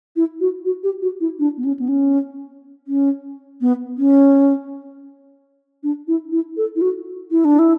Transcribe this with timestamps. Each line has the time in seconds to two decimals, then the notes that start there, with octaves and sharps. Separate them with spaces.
0.16 E4
0.40 F#4
0.65 F#4
0.83 G4
1.02 F#4
1.21 E4
1.39 D4
1.57 B3
1.65 C#4
1.79 B3
1.89 C#4
2.87 C#4
3.61 B3
3.98 C#4
5.83 D4
6.08 E4
6.32 E4
6.57 A4
6.76 E4
6.81 F#4
7.31 E4
7.45 D4
7.59 E4